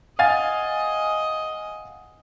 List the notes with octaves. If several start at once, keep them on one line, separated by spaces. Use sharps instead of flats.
D#5 F5 F#5 G#5 A6